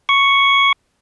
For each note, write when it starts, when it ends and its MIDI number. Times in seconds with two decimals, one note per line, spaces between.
0.09 0.72 85